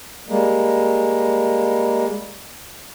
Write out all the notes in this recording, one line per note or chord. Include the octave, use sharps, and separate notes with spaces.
G3 G#3 A#3